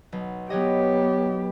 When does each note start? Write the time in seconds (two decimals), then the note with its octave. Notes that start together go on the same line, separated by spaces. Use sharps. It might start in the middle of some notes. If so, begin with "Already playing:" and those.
0.12 B1
0.50 F#3 B3 G4 C#5 D#5